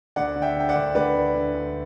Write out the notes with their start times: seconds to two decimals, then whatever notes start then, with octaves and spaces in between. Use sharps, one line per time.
0.16 D2 D5 F#5
0.36 D3
0.42 E5 G5
0.56 D3 G5
0.69 D5 F#5
0.75 D2
0.95 D2 B4 D5
1.14 D3
1.34 D3
1.55 D2